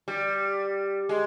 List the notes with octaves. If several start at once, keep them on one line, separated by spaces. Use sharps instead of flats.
G3
G#3